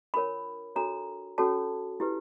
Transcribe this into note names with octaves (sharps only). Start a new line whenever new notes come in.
D4 F4 A#4 C#5 B5
D4 F#4 A4 C#5 A#5
C#4 F#4 A4 C#5 A5
E4 G4 B4